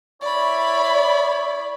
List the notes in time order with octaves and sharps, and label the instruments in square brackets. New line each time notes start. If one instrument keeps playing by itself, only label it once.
[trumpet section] E4 C#5 [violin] D5 B5